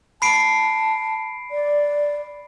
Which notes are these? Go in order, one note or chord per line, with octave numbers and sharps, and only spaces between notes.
A5 B5 C7 D7
D5